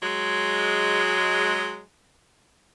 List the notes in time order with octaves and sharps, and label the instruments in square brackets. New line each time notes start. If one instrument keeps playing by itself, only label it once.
[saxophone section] F#3 G#3